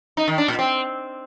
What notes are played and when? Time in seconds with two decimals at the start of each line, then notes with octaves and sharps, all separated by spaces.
0.17 D#4
0.28 D#3
0.38 D4
0.48 A#2
0.59 C4